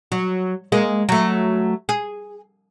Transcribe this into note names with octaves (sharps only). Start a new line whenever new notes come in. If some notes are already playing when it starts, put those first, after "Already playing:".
F#3
G#3 A#3 G#4
F#3 A3
G#4